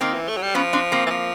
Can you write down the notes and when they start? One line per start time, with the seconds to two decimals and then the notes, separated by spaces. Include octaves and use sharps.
0.01 D#3 A#3 C4
0.14 E3
0.28 A3
0.36 F#3
0.42 G3
0.55 F3 B3 C#4
0.73 C4 D4
0.92 A#3 C4
1.06 E3
1.10 F3